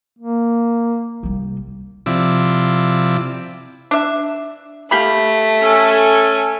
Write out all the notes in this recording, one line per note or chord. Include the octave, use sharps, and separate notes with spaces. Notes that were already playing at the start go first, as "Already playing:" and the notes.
A#3
C2 G3
C3 F3 E4 D5
D4 E5
A3 G4 F5 B5
C#4 A4 G#5